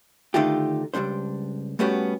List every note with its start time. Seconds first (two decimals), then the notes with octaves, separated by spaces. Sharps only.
0.34 D3 D#3 A3 D#4 F4 G4
0.94 C#2 G2 G3 D4 C5
1.79 G3 A3 B3 C#4 F#4 G4